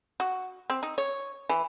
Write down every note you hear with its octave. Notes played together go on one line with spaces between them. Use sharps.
F#4
C4
D#4
C#5
E3